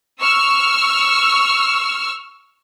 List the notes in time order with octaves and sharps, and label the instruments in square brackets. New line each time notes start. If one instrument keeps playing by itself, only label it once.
[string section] C#6 E6 F6